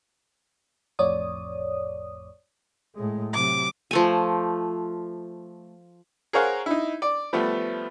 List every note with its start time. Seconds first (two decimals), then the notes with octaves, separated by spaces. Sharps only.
0.99 A1 F2 A2 C#5 D5 D#6
2.96 A2 G#3
3.33 C3 F#3 D6
3.91 F3 A3 G#5
6.33 G#4 A#4 C5 C#5 F5 F#5
6.66 D#4 E4
7.02 D5
7.33 F3 G3 A3 B3